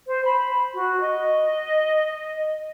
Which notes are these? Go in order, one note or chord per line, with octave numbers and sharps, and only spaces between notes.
C5
B5
F#4
D#5